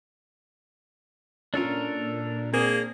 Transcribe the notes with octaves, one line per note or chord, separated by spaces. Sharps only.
A#2 C#4 D4 F4 A4 A#4
A#3 C4 D4 G#4